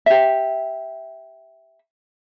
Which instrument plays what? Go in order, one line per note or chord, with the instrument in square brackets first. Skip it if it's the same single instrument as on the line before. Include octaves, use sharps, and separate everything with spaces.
[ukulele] G4 E5